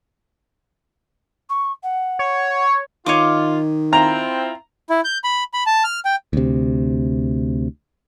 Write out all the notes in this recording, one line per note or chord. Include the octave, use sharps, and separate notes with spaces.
C#6
F#5
C#5
D#3 F4 C#5 D#5 D6
C4 E4 F4 A#5
E4
G6
B5
B5
A5
F6
G5
D2 C3